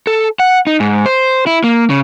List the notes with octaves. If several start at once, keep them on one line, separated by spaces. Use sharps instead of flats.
A4
F#5
D#4
G#2
C5
E4
A#3
C#3